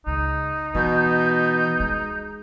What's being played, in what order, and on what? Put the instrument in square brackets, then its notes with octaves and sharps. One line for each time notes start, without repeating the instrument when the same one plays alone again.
[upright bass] C#2 [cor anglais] D#4
[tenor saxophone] B2 [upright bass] E3 [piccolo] G6
[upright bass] G#3